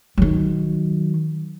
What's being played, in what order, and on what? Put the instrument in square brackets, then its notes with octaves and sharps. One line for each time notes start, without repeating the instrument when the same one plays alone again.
[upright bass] D#3 F#3